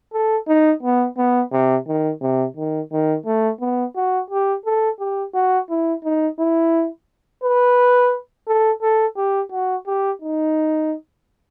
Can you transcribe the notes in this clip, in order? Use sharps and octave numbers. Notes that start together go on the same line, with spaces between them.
A4
D#4
B3
B3
C3
D#3
C3
D#3
D#3
A3
B3
F#4
G4
A4
G4
F#4
E4
D#4
E4
B4
A4
A4
G4
F#4
G4
D#4